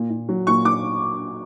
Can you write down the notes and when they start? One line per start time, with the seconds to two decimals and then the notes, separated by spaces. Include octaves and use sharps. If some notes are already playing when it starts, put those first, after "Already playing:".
Already playing: A#2
0.10 A#2
0.29 F#3
0.47 A#2 C#6
0.65 A#2 D6